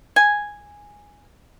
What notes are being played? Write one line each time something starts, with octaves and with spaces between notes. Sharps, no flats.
G#5